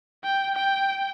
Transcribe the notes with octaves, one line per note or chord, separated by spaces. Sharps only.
G5
G5